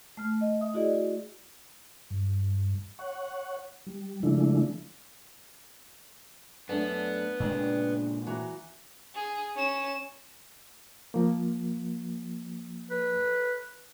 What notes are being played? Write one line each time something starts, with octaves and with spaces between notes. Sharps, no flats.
A3 F6
D#5
E5 D#6
E4 F#4 G#4 D5 D#5
F#4
G2
C#5 F#5
G3
C#3 F3 G#3 A3 D4 E4
F#2 A3 B3 D4
A#2 C#3 G#3 D4 G5
E3 F#4 A#5
G#4
C#4 E7
F3 A#3
B4